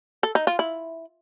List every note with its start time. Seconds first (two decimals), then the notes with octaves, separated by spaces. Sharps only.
0.23 A4
0.35 D#4
0.47 F4
0.59 E4